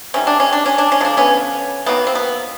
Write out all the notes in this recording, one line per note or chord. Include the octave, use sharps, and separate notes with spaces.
C3 D#3 G3 C#4
D4
C#4
D4
C#4
D4
C#4
D3 F3 G#3 B3 D4
B3 C#4
D#3 F#3 A#3 B3
C4
B3